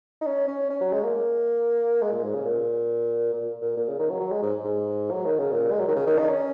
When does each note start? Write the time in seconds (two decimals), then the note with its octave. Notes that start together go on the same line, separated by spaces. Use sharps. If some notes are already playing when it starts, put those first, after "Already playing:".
0.21 D#4
0.26 C#4
0.48 C#4
0.70 C#4
0.81 F#3
0.92 G#3
1.03 A#3
2.02 G#3
2.12 A#2
2.24 G#2
2.34 C#3
2.45 A#2
3.34 A#2
3.62 A#2
3.77 A#2
3.88 C#3
3.99 D#3
4.10 F#3
4.20 F#3
4.31 G#3
4.42 G#2
4.64 G#2
5.11 F#3
5.25 D#3
5.39 C#3
5.52 A#2
5.72 G#3
5.80 F#3
5.88 D#3
5.96 C#3
6.07 D#3
6.19 D#4
6.29 C#4